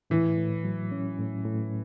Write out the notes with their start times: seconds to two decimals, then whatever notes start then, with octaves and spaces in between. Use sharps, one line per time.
0.10 A2 E3
0.38 A2
0.64 F#3
0.91 C#4
1.18 A2
1.45 A2